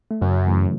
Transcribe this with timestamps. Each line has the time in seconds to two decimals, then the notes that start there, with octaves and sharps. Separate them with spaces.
0.11 A3
0.21 F#2 C#3 F#3
0.47 E3 A3